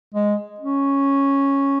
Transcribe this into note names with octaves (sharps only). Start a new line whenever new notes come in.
G#3
C#4